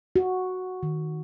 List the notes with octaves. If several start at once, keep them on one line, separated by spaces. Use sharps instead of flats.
F#4
D#3